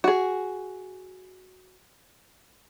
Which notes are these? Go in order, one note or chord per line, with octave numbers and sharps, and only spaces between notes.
F#4 G#4